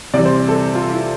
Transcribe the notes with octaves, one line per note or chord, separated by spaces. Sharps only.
C3 E3 G3 D5
C5
A4
F4
E4